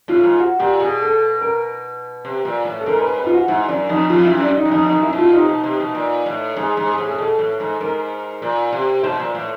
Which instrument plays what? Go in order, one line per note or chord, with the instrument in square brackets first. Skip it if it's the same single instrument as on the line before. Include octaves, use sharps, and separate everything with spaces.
[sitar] A2 [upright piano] F4
[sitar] G#2
[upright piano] F#4
[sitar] A#2 [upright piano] G4
[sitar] B2 [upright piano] G#4
[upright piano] A4
A#4
[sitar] C3
A#2
A2
[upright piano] A4
[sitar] G#2 [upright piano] A#4
[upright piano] B4
B4
F4
F#4
[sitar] G#2 [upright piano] E4
[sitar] F#2 [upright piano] D4
[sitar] F2 [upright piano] D#4
[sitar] F2 [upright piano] F4
[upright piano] E4
[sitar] F#2
[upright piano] D4
D#4
[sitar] F#2
[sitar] F2 [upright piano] D#4
[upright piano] D#4
[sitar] F#2
[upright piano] E4
[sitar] B2
[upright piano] F4
[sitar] C3 [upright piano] D#4
[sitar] B2
C3
B2
A#2
A2
[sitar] G#2 [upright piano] G#4
[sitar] G#2
[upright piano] G#4
[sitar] A2
[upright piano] G#4
[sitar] B2 [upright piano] A4
[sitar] A2
G#2
[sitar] G#2 [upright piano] A#4
[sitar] A#2
C3
[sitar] B2 [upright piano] C5
[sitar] A#2
A2